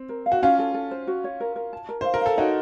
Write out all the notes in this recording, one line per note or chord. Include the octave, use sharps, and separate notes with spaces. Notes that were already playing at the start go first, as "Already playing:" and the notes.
Already playing: C4
A#4
F5
F#4
C#4 F4 F5
A4
A4
C5
F#4
C#5
A#4
A#4
A5
A#4
C5 F5
A#4
A4 F5
D#4 F#4 C#5